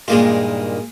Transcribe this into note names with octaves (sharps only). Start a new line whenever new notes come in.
G2 A#2 D#3 G#3 A#3 F4